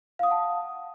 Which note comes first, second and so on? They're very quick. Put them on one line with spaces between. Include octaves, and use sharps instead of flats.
F5 D#6 F#5 A5